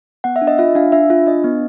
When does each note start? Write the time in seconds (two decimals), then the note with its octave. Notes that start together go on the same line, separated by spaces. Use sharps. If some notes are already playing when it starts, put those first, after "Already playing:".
0.24 B3 F#5
0.36 E5
0.42 D4
0.47 D#5
0.58 F4 E5
0.75 D4 F5
0.92 D4 E5
1.10 F4
1.26 D4 D#5
1.44 B3